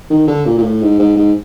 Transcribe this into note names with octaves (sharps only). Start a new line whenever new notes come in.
D#3
D3
A#2
A#2
A2
G#2
G#2
G#2